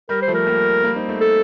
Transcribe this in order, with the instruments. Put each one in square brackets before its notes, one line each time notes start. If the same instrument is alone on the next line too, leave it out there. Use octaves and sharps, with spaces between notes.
[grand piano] G3 [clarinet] A#4
[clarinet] C5
[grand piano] F3 A3
[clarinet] A#4
[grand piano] G3 A#3
G3 A#3
C4 D#4
A3 C4
[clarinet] A4